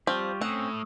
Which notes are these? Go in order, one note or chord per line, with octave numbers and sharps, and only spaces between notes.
F3 G3 C4 F4 G4 C#6
A2 C4 C#4 F#5 D#6 E6